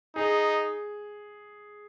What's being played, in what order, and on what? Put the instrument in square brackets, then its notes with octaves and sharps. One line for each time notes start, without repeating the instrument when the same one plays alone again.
[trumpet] D#4 [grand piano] G#4